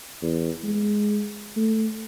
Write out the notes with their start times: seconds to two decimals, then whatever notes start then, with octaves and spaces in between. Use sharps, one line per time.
0.22 E2
0.64 G#3
1.56 A3